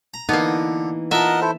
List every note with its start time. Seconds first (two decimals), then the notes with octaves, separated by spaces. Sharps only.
0.14 A#5
0.29 D3 E3 A#3 B3 D#4
1.11 F4 A#4 D#5 E5 F#5 A5
1.41 E4 A4 C5